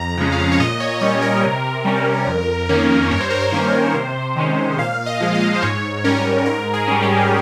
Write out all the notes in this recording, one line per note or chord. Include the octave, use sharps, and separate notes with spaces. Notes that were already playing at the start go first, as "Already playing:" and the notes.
Already playing: F2 A#5
C#3 F3 G#3 C#4
F5
C#5
A#2 D#5
C#5
G3 C#4 C#5
A#4
C3
G3 C#4
F2
D#3 A#3 C#4
G2 C#5
C5
A#4
C5
D#3 A#3 C#4
C3
D#3 G#3 C#4
A#2 F5
D#5
F3 G#3
F5
C5
G#2 C#5
G3 C#4 A#4
G#2 A#4
G#4
G3 C#4
G4